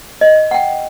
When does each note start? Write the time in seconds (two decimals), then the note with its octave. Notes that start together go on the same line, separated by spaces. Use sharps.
0.21 D#5
0.51 F#5 G5